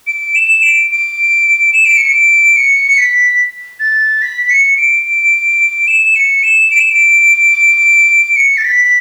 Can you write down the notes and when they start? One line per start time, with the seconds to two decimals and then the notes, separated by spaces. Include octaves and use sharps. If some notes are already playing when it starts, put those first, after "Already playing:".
0.07 D7
0.35 E7
0.63 D7
0.91 D7
1.73 E7
1.85 D7
1.97 C#7
2.09 D7
2.56 C#7
2.88 C#7
2.98 B6
3.80 A6
4.22 B6
4.42 B6
4.50 C#7
4.77 D7
5.88 E7
6.16 C#7
6.43 E7
6.71 D7
6.80 E7
6.90 D7
8.36 C#7
8.57 A6
8.65 B6
8.84 B6